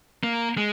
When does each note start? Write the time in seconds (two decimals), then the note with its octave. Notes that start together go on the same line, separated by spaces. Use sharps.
0.24 A#3
0.57 G#3